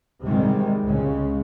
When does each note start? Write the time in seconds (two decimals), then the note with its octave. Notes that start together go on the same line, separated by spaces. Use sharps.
0.22 G#2 C3 D#3 G3 G#3
0.82 C#2 C#3 G#3